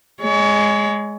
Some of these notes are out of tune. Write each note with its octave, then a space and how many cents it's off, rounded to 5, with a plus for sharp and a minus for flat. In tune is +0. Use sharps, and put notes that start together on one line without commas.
G#3 +0 C#5 +30